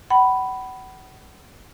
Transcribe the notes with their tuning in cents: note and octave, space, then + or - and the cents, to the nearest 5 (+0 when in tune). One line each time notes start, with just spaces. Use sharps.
F#5 +35 B5 +0